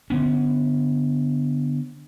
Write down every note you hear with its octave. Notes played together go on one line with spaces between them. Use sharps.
D3 B3 C#4